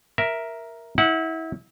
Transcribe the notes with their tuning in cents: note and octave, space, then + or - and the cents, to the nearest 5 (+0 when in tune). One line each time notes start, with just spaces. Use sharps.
A#4 +5 E5 +0
E4 -30 F#5 -5